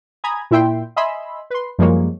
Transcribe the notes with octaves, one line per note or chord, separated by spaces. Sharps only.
G#5 A#5 B5 D#6 G#6
A#2 E4 E5 G5 C6
D#5 E5 G#5 B5 C6 E6
B4 C6
F#2 F3 G3 G#3 A#3 C#5